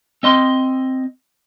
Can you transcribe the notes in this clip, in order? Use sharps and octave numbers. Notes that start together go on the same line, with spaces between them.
C4 D#5 C6